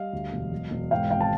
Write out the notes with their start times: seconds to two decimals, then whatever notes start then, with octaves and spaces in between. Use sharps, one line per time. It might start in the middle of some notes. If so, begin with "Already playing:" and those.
Already playing: G3 D#5 F5
0.13 D2
0.32 E1
0.51 F#3
0.71 E1
0.91 G#2 F5 G5
1.11 G#1 F5 G5
1.21 A5